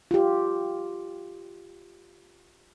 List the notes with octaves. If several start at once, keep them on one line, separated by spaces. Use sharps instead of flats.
F4 G4